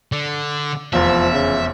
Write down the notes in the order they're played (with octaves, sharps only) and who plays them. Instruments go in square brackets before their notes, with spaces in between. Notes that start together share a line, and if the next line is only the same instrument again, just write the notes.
[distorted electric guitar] D3
[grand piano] F1 E2 [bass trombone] F3 [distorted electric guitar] E5
[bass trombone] C#3